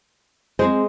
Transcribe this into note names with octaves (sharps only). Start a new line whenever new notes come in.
G#3 C4 G#4 C5